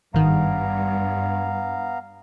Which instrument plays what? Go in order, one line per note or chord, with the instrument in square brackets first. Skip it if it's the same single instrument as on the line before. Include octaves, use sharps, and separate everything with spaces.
[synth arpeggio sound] G#1 D#3 [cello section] G2 [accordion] B3 F5 A#5